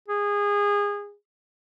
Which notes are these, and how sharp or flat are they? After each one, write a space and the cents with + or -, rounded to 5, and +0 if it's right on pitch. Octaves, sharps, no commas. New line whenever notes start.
G#4 -25